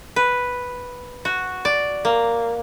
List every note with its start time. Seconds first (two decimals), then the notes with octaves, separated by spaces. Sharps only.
0.16 B4
1.25 F#4
1.65 D5
2.05 A#3